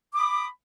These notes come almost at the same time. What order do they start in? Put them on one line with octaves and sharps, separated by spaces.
D6 D#6 B5